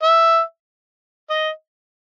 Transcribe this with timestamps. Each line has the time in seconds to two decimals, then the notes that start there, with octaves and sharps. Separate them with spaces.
0.03 E5
1.30 D#5